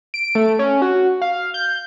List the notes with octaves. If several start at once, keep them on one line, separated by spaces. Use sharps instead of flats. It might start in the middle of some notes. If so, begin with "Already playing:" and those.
D7
A3
C#4
F#4
F5
G6